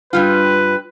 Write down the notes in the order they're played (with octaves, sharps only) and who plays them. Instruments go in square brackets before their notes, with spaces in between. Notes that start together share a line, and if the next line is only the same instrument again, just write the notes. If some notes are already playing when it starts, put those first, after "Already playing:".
[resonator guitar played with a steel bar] G2 G3 F4 [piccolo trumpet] B4